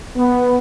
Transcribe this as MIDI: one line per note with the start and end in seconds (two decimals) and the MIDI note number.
0.16 0.58 59